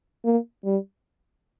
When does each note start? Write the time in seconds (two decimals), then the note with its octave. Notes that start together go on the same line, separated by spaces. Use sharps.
0.25 A#3
0.65 G3